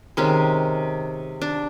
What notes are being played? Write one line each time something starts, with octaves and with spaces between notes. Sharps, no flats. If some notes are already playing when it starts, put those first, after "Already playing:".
C3 D#3 G#3 C#4
D4